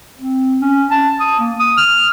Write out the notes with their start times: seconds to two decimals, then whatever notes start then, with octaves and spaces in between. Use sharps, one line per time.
0.19 C4
0.61 C#4
0.91 A5
1.20 D#6
1.40 A#3
1.59 D#6
1.78 F6